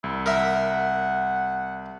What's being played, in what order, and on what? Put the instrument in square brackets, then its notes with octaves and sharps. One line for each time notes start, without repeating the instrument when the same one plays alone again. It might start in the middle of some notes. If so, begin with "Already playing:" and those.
[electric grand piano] C2 [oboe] E4
[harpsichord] A#4 E5 [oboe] F#5
[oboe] F#5